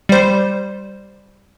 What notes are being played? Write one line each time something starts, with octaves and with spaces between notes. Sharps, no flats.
G3 C5